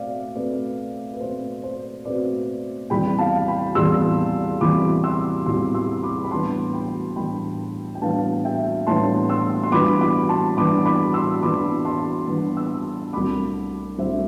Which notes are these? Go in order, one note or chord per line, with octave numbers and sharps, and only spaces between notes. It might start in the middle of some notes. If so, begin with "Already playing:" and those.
Already playing: B2 A3 C4 D5 E5 F5
B2 A3 C4 B4 D5
B4
B2 A3 C4 C5
C5
B2 A3 C4 B4 D5
E2 C3 E3 G3 G5 B5
F5 A5
G5 B5
E2 C3 E3 G3 C6 E6
E2 C3 E3 G3 B5 D6
C6 E6
E2 C3 E3 G3 C6 E6
C6 E6
B5 D6
B5
A2 E3 G3 B3 D4 A5 C6
G5 B5
A2 E3 G3 B3 D4 G5 B5
G5
A2 E3 G3 B3 D4 F5 A5
E5 G5
A2 E3 G3 B3 D4 A5 C6
C6 E6
C6
G2 E3 B3 D4 B5 D6
B5 D6
A5 C6
G2 E3 B3 D4 B5 D6
B5 D6
C6 E6
G2 E3 B3 D4 B5 D6
A5 C6
G2 E3 B3 D4
C6 E6
C2 B2 A3 D4 B5 D6
C2 B2 A3 D4 C5 E5